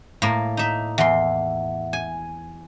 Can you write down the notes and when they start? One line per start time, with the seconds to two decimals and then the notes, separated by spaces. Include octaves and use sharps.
0.22 A2 A#3
0.57 D#4 E5
0.98 E2 E5 F#5 C6
1.93 G#5